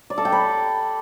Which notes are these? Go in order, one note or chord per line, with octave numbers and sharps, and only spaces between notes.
D5
A4
G5
B5